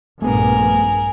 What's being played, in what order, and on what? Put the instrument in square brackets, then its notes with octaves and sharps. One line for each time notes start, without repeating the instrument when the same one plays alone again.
[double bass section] A#1 G2 [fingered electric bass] A3 B3 [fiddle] G#4 A#4